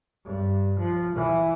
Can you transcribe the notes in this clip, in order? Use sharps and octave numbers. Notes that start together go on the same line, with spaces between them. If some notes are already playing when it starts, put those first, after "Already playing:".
G2
F3
E3